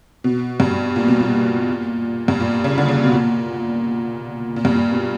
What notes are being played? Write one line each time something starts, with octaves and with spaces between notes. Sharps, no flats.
B2
G2
A#2
B2
A#2
G2
A#2
C#3
D3
C#3
B2
A#2
A#2
G2
A#2
B2